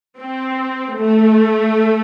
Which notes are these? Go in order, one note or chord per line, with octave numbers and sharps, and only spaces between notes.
C4
A3